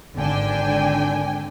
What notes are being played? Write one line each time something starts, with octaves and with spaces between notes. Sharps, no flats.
G#1 G#2 D3 D4 G5 G#5